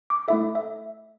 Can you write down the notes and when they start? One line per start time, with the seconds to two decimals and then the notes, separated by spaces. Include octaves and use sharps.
0.10 D6
0.28 A3 E4 A4 E5
0.55 E5